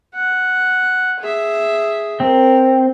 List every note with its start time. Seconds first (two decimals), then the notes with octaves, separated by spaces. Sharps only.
0.15 F#5
1.20 G#4 E5
2.20 C4 A#4